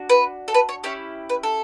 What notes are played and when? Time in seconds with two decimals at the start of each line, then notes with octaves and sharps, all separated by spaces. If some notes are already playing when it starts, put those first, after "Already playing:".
Already playing: D4 F#4
0.10 B4
0.48 A4
0.54 B4
0.69 C#5
0.84 C#4 E4 G4 C#5
1.30 B4
1.43 A4